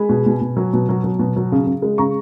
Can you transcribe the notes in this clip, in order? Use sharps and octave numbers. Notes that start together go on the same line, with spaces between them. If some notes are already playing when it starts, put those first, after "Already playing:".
Already playing: G#3 G#5 B5
B2
B2
B2
F#3
B2
F#3
F#3
B2
F#3
C#3
C#3
G#3
C#3 A#5 C#6